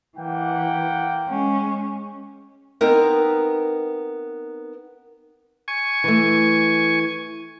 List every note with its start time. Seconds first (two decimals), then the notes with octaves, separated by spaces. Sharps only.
0.17 E3 A#3 F#5 G5
1.28 G#3 C#4
2.81 B3 C4 D#4 A#4 B4
5.68 G#5 C#6
6.04 E3 A3